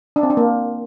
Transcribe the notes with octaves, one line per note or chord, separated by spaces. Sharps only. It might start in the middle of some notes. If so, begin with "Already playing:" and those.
D4
C4
D4
A#3